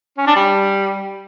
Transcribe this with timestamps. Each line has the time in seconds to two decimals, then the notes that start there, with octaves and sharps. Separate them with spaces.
0.18 C#4
0.27 D4
0.36 G3